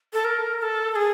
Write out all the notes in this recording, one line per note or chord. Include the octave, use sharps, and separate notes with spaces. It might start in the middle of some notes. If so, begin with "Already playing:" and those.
A4
A#4
A#4
A4
A4
G#4